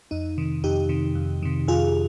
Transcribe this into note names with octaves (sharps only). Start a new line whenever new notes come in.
F2 D#4
C3 D#3
F2 D#4 G4
C3 D#3
F2
C3 D#3
F2 F4 G#4